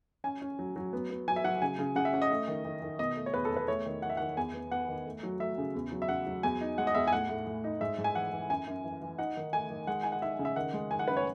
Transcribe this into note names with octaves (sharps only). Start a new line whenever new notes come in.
C#4 G#5
C#4
F#3
F#3
B3
B3
F#3 G#5
E5
F#3 F#5
C#3 G#5
C#3
C#3 F#5
E5
C#4 F#5
D#5
A3
D#3
D#3
D#3
B2 D#5
A3
C#5
E2 B4
A4
E2
B4
A3 C#5
D#3
D#3 F#5
E5
F#5
D#3
E2 G#5
B3
B3 F#5
D#3
A3
F#3
A3 E5
C#3
E2
F#3
E5
C#3 F#5
F#3
E2 G#5
D#4
G#3 F#5
D#5
E2 E5
G#5
A2 F#5
A2
A2
D#4
G#2 E5
G#2
G#5
E3 F#5
E3
F#2 G#5
F#2
E3
E3
D#4 F#5
D#3
A3 G#5
D#3
G#3 F#5
D#4 G#5
F#5
D#4 E5
C#3
E5
D#3 F#5
G#3
D#3 G#5
F#5
F#2 B4
C#5